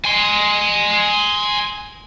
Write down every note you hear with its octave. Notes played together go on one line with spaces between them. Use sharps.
G#5 C6